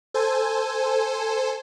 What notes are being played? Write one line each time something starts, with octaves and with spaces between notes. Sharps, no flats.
A4 C5 G#5